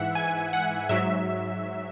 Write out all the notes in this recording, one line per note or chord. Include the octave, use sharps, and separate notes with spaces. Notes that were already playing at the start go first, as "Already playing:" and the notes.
Already playing: G#2 E3 E5 F#5
G#5
F#5
G#2 F#3 E5